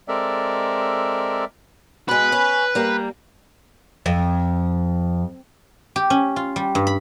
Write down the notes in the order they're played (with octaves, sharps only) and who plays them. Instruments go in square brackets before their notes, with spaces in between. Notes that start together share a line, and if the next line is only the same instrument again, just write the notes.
[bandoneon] G#3 C4 A4 A#4 D5 E5
[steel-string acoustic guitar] B2 G#3 [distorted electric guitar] B4
[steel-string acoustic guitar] C#4
G3 A#3
[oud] F2
[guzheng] G4
C#4
F4
G3
G2
B5